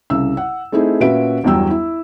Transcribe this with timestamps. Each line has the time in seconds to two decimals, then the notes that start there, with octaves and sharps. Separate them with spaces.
0.10 C2 C#3 E6
0.37 F#5
0.72 A3 C4 D#4 E4 G#4
1.00 A#2 C#4 F#4 B4 E5 D7
1.44 G1 E2 F#3 G3 G5 E6
1.70 E4